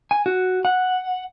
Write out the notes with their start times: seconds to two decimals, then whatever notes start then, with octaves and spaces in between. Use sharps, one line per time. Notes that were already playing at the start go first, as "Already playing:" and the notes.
0.11 G#5
0.26 F#4
0.65 F#5